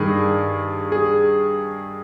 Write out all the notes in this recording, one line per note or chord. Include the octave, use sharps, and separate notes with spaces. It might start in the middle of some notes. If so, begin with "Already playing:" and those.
Already playing: G2 D#3 G#4
G#4